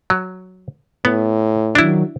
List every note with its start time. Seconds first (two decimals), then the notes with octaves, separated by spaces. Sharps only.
0.10 F#3
1.05 A2 B3
1.75 D#3 F#3 D4 E4